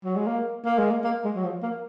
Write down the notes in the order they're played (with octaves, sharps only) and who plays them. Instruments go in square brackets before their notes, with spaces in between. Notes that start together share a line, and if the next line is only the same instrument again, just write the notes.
[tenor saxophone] F#3
G#3
A#3
A#3
G#3
A#3
A#3
G#3
F#3
F3
A#3